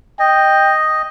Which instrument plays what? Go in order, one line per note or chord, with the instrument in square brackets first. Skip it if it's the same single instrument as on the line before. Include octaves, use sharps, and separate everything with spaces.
[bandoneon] D#5 [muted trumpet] G5